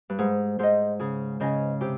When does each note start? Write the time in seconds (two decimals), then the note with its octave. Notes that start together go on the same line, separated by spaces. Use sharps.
0.10 G2
0.18 G#2 G#4
0.59 G#2 C5 D#5
1.00 C#3 G#4
1.40 C#3 C5 D#5 G#5
1.81 C3 G4